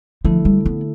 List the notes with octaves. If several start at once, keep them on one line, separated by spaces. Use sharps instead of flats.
D3 F3 A3 E4 A4
G3
B3